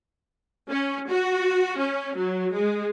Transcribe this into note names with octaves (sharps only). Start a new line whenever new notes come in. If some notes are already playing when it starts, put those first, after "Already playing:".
C#4
F#4
C#4
F#3
G#3